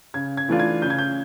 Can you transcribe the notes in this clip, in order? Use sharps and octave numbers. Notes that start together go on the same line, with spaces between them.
C#3 G#6
G#6
E3 A3 D4 F4
G#6
C#3 G6
G#6
G6